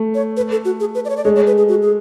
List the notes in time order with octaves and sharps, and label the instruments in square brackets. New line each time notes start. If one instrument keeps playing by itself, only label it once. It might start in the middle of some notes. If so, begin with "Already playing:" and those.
Already playing: [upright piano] A3
[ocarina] C#5
B4
A4
F#4
G#4
B4
D5
C#5
D5
[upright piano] G#3 [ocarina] C#5
[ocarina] C#5
B4
G#4
F#4
G#4